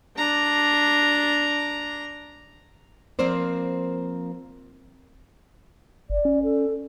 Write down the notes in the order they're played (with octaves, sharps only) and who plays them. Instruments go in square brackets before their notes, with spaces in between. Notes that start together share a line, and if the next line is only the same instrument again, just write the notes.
[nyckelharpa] D4 A#5
[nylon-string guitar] F3 A#3 C4 A#4 C5 D5
[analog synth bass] G1 [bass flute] D5
[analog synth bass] C#4
[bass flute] A4